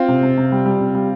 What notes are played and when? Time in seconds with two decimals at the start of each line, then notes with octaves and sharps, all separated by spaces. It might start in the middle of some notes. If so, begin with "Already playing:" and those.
Already playing: C4 F4
0.08 C3
0.23 C3
0.37 C3
0.52 G3
0.66 G3
0.81 C3
0.95 G3